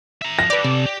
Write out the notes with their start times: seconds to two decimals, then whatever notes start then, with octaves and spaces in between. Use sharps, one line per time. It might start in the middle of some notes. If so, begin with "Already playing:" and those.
0.22 E5 A#5
0.39 F3 A#6
0.50 G4 A4 B4 D5
0.64 C3 D5
0.86 G4